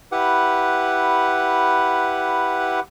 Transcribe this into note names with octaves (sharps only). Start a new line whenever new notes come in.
E4 G4 B4 F#5